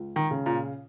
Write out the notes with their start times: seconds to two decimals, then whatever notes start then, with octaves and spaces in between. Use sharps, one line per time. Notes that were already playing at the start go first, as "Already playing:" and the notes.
Already playing: C#2
0.16 D#3
0.31 C#3
0.46 A#2